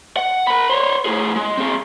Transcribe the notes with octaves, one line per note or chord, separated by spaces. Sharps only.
F#5
A#4 B5
C5 C#5
A2 G#4
G#3
C4 G#4